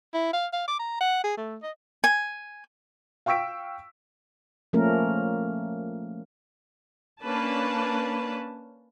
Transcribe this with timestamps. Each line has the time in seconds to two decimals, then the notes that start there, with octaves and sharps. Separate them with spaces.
0.14 E4
0.33 F5
0.53 F5
0.68 D6
0.80 A#5
1.01 F#5
1.24 G#4
1.38 A3
1.63 D#5
2.04 G#5
3.26 F5 G5 C#6 E6 B6 D7
4.73 F3 A3 A#3 C#4 A#4
7.22 A#3 C#4 D4 B4 A5